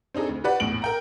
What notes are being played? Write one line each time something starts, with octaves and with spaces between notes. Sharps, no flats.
C4 D4 D#4 G#4 A4
D2
F#4 G4 B4 D5 F#5
A#1 E2 A2 D7 F#7
A#4 G5 A#5